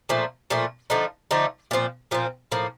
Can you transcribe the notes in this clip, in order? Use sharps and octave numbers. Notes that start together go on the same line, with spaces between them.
A#2 F3 A3
A#2 F3 A3
D3 F3 A3 D#4
D3 F3 A3 D#4
A#2 F3 C4
A#2 F3 C4
A2 F3 A#3